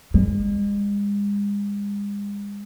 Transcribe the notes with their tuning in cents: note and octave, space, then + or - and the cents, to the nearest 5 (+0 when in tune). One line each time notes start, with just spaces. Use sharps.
G#3 -40